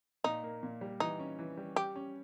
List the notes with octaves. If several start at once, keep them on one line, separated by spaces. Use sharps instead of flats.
A#2 D#4
A#3
A#2
G3
E3 D#4
C#4
E3
G3
G3 G4
C#4